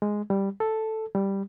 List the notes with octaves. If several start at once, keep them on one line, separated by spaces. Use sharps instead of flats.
G#3
G3
A4
G3